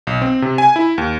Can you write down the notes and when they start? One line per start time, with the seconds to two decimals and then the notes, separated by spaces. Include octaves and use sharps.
0.07 B1
0.22 C4
0.42 C3
0.58 G#5
0.76 E4
0.98 D#2